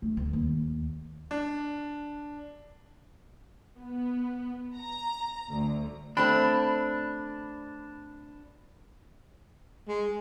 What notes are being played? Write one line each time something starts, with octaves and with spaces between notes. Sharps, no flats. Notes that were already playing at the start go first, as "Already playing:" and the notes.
A3
D2
D#2
D4
B3
A#5
D2
A3 C4 D4 G5 B5
G#3